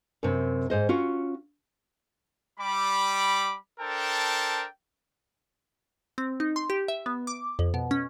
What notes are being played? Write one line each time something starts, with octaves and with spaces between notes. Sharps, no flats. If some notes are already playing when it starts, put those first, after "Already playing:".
F#2 C3
G#2 C5 D#5
C#4 F4 F#4
G3 B5 D6
D4 A4 A#4 C5 G5 A5
C4
D#4
C6
G4
E5
B3
D6
F2
B2
C#4